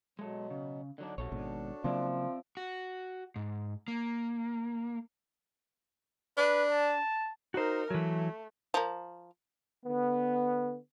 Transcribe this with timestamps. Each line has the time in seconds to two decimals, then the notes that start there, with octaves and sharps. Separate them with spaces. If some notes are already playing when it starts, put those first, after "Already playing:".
0.19 B2 F#3 G#3 A4
0.50 C#3
0.98 D3 F#3 D4 D#4
1.18 A#1 C3 F#4 A4 C#5
1.32 G#1 G#2 B2 D4
1.84 C#3 F3 F#3 A#3 C4 D5 E5
2.57 F#4
3.36 G#2
3.88 A#3
6.38 D4 B4
6.72 A5
7.54 D#4 F#4 A#4 C5
7.90 E3 F#3 A3
8.74 F3 A#4
9.85 D3 B3